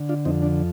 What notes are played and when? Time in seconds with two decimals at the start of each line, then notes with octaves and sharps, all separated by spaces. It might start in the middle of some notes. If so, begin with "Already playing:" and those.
Already playing: D3
0.09 D4 F4
0.25 F2 C4 D#4
0.43 D4